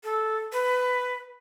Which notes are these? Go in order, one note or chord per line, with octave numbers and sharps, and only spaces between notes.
A4
B4